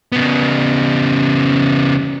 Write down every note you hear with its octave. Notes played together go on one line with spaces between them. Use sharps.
C#3 B3